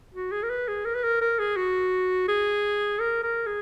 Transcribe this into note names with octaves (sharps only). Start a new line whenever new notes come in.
F#4
G#4
A#4
B4
G#4
A#4
B4
A#4
A#4
G#4
F#4
G#4
A#4
A#4
G#4